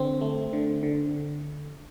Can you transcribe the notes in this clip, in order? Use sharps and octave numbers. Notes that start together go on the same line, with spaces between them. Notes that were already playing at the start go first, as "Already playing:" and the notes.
Already playing: D3 C4
A3
D3
D3